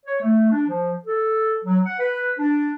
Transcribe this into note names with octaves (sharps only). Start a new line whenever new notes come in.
C#5
A3
D4
F3
A4
F#3
F#5
B4
D4